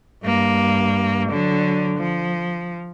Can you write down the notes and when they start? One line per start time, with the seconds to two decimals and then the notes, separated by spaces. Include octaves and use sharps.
0.24 G2 A#3
1.30 D3 F#3
1.98 F3